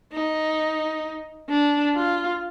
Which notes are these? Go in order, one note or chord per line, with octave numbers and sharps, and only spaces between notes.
D#4
D4
F4